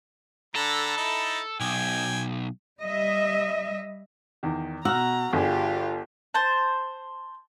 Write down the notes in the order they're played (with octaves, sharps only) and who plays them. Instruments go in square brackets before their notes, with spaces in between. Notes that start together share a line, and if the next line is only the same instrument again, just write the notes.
[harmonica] D3 A#5 B5 [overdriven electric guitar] A4
[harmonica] D#4 E4
[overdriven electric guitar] B1 [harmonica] G5 G#5
[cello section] G3 D#5 E5
[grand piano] E2 D#3
[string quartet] B2 A#5 [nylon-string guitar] F#4 [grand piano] E6 F6
[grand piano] G1 G#4 [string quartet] F4 G4
[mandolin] C5 A5